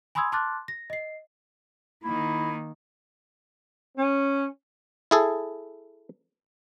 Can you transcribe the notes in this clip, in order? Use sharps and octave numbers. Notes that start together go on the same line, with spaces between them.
G#5 B5 C6 D#6 E6 G#6
A5 C6 D6 F6 F#6 A6
A#6
D#5 C7
D#3 A#3 E4
C#4
E4 G#4 A4